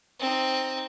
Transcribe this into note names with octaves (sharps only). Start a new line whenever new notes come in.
C4 D#4